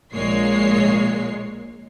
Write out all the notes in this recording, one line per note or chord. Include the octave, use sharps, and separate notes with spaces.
A#1 A#2 G#3 C#5 C7